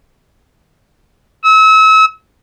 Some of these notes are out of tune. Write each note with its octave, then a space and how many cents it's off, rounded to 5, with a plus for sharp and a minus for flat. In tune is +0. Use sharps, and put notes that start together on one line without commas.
E6 -35